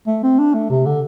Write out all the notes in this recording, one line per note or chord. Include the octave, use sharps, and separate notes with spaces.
A3
C4
D4
A3
C3
D3